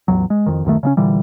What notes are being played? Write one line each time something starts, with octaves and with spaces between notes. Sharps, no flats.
A1 E2 G#2 F#3
G#3
F2 D#3
D1 F#2 D#3 A3
C#3 G#3 C#4
A#2 D3 E3 G3